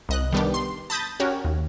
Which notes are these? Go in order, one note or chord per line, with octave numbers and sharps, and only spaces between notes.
C2 D#5 F#6
D#3 G3 B3 D4 G4
C6
A5 B5 D#6 G6 A6 A#6
C#4 F#4 G4 A#4 C#5
D#2